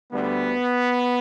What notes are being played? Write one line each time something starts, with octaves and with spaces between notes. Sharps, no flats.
D2 D3 G3 B3